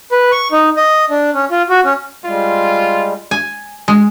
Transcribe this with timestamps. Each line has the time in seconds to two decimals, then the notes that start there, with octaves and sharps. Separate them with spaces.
0.12 B4
0.32 C#6
0.52 D#4
0.77 D#5
1.10 D4
1.34 C#4
1.51 F4
1.70 F#4
1.85 C#4
2.25 G3 G#3 F4
3.31 G#5
3.88 G#3